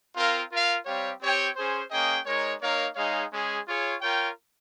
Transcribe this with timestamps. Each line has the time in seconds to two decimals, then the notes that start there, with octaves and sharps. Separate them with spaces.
0.15 C4 F4 A#4 F5
0.50 F4 A#4 F5
0.86 G3 C4 G4 C#5 F5
1.20 C4 G4 C#5 G5
1.56 C#4 G#4 C5
1.90 A#3 C#4 G#4 D#5 G5
2.25 G#3 D#4 A#4 C#5
2.61 A#3 D#4 A#4 C#5 F5
2.95 G#3 D#4 G#4 C#5 F5
3.31 G#3 C#4 G#4
3.66 F4 G#4 C#5
4.01 F4 A#4 C#5 G5